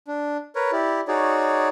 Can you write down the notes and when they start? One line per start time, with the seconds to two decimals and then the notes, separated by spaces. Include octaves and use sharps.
0.08 D4
0.56 A#4 B4 C#5
0.72 E4 G4 D5
1.08 D#4 F#4 G#4 C#5 D5